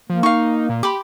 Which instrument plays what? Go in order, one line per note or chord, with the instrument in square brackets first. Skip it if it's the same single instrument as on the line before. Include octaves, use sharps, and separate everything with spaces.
[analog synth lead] F3 [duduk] A#3
[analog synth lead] D#4 [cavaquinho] F5 C#6
[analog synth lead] A#2
[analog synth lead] G4 [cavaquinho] B5 C6 D6